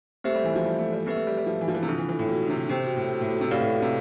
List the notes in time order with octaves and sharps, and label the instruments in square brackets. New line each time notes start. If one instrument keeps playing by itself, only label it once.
[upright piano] A3 [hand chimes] C4 G4 C5 E5
[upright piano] G3
E3
F3
G3
A3
G3
[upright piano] A3 [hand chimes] C4 G4 B4 E5
[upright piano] A3
G3
G3
F3
E3
F3
E3
C3
[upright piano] D3 [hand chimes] C4 F4 A4
[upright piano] E3
E3
A2
B2
D3
C3
[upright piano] C3 [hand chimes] G4 C5 G5
[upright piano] B2
A2
B2
A2
B2
C3
[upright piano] A2 [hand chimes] C4 G4 B4 D5 F5
[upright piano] A2
B2
C3